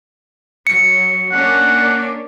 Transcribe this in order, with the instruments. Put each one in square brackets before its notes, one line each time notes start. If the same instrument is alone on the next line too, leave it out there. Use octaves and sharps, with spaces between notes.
[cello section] F#3 [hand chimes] C#7
[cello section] A#3 C#4 D4 [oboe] F#5